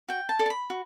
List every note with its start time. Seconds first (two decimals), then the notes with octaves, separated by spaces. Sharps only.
0.09 F#4 G5
0.29 A5
0.39 A4 D5
0.46 A5
0.50 B5
0.70 F#4